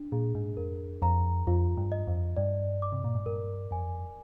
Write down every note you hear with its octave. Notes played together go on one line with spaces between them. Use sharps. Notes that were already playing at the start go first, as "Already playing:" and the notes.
Already playing: D4
A#2 G#4
G#2
F2 A#4
F2 A#5
F2 F4
G2
D#5
F2
G2 D5
D6
C3
A#2
G#2
G2 A#4
F2 G#5